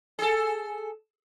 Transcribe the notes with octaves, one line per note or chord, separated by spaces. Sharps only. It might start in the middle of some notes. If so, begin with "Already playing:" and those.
G#4 A4